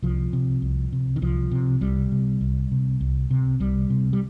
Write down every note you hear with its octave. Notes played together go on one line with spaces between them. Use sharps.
C2 F3
C3
C2
C3
D#3
C2 F3
C3
C2 G3
C3
C2
C3
C2
C3
C2 G3
C3
G3